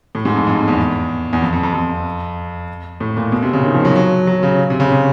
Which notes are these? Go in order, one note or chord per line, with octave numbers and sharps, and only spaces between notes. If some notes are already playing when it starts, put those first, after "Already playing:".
A2
G#2
F2
F2
F2
E2
E2
F2
F2
F2
F2
A2
A#2
B2
C3
C#3
D#3
F3
F#3
F#3
F#3
C#3
C3
C#3
C3